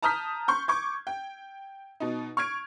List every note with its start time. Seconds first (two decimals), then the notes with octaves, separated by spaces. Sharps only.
0.02 A5 A#5 D#6 F6 G6 B6
0.48 C6 C#6 G6
0.68 C#6 D6 G#6
1.07 G5
2.00 B2 D#4
2.37 C#6 F6 G#6 D7